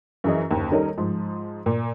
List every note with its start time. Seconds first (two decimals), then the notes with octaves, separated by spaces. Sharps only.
0.24 F#2 E3 G#4 D#5
0.51 F#1 D#2
0.71 D#3 G3 C#4 D#4 A4 A#4
0.98 G#2 F3
1.66 A#2